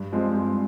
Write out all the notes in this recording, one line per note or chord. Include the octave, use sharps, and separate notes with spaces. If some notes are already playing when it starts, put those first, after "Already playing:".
Already playing: G2
F3 G#3 C4
G2